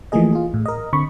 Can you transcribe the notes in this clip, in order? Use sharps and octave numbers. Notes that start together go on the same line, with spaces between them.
E3 F3 A3 A#3 G#4 D#5
F4 G#4
A2
A#4 D#5
D3 C4 B5 C#6